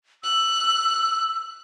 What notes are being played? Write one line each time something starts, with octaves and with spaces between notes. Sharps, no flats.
E6 F#6